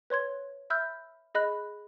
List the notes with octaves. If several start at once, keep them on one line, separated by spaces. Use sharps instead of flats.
B4 C#5 C6 G#6
E5 B5 E6 F6 G6
G#4 D#5 B5 F#6